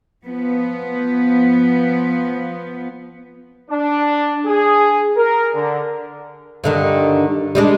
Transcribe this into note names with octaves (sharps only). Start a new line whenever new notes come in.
F3 B3
D4
G#4
A#4
D3
G2 D3 D#3
G3 G#3 D4